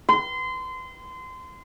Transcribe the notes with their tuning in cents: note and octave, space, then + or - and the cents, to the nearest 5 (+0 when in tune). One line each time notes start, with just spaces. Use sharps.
C6 -25